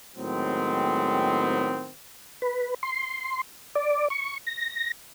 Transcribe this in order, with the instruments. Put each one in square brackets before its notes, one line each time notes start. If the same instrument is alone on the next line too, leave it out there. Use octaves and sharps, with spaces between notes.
[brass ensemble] A2 D#3 F#3 G#3 B3 C4
[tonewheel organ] B4
C6
D5
C#6
A#6